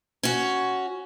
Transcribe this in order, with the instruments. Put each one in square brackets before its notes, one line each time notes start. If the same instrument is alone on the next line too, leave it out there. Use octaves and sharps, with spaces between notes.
[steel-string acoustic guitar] C#4 F#4